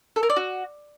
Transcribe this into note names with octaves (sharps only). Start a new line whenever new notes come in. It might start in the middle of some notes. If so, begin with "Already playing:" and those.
A4
A#4
D5
F#4